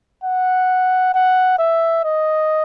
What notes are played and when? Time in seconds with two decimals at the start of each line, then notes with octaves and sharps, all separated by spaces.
0.24 F#5
1.14 F#5
1.59 E5
2.04 D#5